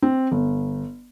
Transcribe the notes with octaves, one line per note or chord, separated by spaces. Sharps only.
C4
G1